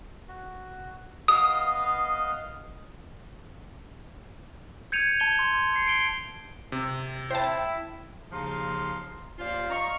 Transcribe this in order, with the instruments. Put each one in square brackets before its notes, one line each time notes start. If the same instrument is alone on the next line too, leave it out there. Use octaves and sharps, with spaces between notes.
[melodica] F#4
[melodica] B3 D#5 F5 [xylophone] D#6
[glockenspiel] G6 G#6 C#7 D#7 F7
A5 G#6 D#7 E7 G7
C6
C7 C#7
C7 D7 G7
[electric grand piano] C3
[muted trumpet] E4 [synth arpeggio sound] C5 A5 [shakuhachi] G5
[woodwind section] D#2 C#3 F3 D#4 F5 C6
D#2 C#4 F4 C5 D5 F5
D#5 F5 A#5 C6 C#6